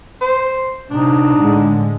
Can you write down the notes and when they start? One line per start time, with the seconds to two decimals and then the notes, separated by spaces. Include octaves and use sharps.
0.21 C5
0.90 C3 D4 D#4
1.37 A2 D3 G#3